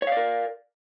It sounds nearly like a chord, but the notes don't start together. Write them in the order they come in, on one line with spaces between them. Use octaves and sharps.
C#5 F5 D5 A#4